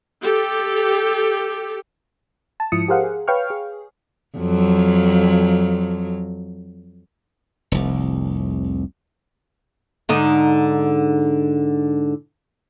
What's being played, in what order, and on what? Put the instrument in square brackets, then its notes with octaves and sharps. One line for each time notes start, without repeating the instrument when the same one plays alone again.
[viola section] G4 A4
[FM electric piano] A5
G#2 F3 E4 D#6 C#7
G4 G#4 A#4 C5 F5 F#5
G#4
B4 C#5 F5 G5 C#6 F6
G#4
[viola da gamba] F2 F#3
[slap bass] F1 C2
[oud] G#2 D3 D#4